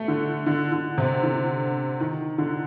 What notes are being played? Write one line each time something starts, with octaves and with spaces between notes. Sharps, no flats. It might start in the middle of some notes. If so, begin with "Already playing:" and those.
Already playing: A3
D3
D3
D3
C3
D3
D#3
D3